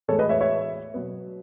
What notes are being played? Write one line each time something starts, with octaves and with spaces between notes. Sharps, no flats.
A2 E3 G#3 B3 A4 C#5
B4 D#5
C#5 E5
C#5 E5
B2 F#3 B3